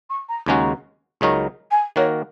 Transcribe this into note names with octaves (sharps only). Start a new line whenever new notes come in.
C#6
A#5
D#2 C#3 G#3 C#4 F#4 A#5
C#2 C#3 F#3 D#4 A#4 C#6
G#5
D#3 A#3 F#4 A#4 C#5